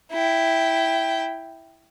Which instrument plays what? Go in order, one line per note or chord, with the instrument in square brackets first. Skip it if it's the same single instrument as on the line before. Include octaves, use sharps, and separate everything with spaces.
[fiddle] E4 G5